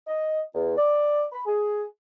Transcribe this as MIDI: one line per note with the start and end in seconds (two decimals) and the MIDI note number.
0.07 0.41 75
0.54 0.76 40
0.77 1.25 74
1.32 1.41 83
1.46 1.84 68